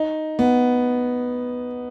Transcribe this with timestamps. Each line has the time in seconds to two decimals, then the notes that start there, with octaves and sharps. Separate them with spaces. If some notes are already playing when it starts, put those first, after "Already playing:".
Already playing: D#4
0.39 B3